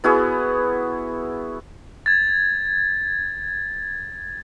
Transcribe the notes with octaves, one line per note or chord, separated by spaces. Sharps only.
B3 E4 F#4 G#4
G#6 A6